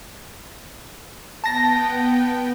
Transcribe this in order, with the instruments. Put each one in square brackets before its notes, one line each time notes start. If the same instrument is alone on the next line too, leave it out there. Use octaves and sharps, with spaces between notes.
[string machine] B3 G5 [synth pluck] A5 A#6